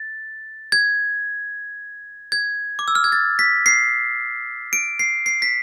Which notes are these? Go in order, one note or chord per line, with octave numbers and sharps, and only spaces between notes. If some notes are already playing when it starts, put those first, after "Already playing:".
Already playing: A6
G#6
G#6
D6
E6
F6
G#6
A6
B6
C7
D7
C7
C7
B6